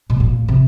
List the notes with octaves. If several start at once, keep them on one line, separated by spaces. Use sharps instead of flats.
B2
A#2
C3